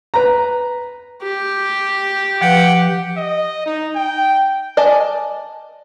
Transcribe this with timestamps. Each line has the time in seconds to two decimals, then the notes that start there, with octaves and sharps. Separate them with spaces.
0.14 B4 A#5
1.23 G4
2.41 F3 B4 F#5 G5
3.17 D#5
3.66 D#4
3.95 G5
4.77 D5 D#5 G#5 A5